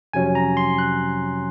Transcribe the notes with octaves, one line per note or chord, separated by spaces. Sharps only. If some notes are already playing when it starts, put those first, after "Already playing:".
F2 C3 F#3 C#4 G#5
A#5
C6
F#6